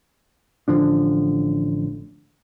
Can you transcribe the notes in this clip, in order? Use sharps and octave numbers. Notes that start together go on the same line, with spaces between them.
A1 D3 F3 D4